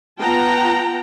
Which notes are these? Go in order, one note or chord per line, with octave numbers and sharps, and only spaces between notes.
B3 F4 F#5 G5 A5 A#5